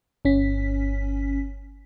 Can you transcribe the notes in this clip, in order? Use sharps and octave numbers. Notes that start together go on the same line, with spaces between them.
G1 C#4 B6